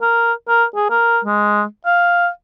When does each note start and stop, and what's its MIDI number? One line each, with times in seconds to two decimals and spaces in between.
0.02 0.33 70
0.48 0.65 70
0.75 0.86 68
0.90 1.19 70
1.24 1.64 56
1.86 2.29 77